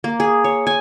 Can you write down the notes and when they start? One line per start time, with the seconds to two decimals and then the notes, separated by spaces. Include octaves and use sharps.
0.04 A#3
0.20 G#4
0.44 C#5
0.67 G#5